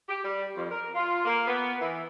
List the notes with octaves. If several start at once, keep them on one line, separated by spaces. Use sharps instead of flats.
G4
G3
F2
A#4
F4
A#3
B3
E3